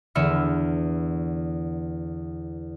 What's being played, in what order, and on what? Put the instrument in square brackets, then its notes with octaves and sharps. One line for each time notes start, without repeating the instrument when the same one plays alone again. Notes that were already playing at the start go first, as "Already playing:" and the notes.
[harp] E2 D3 B3 E5 F6 C#7